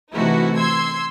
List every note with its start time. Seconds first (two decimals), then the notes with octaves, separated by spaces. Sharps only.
0.13 C3 E3 A3 D#4 E4 F#4
0.57 C6 E6 G#6